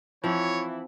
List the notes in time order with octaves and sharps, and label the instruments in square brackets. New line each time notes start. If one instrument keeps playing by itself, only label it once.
[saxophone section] E3 E4 [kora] F3 C4 [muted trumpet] C#5